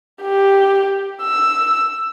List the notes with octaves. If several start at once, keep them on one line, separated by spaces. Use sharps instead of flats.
G4
E6